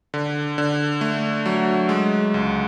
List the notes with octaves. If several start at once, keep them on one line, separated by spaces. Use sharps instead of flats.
D3
D3
A3
F#3
G#3
C#2